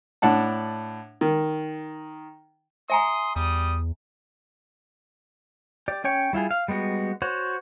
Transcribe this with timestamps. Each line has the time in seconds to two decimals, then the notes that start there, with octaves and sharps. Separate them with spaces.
0.22 A2 D4 F#5 A5
1.21 D#3
2.90 E5 G#5 A#5 C6 D#6
3.36 E2 G3 D#6
5.88 G4 D5
6.04 C#4 C#5 G5 C#6
6.33 G3 E4 F4 G#4
6.51 F5
6.68 G3 G#3 B3 F#4
7.22 F#4 C5 C#5 F#5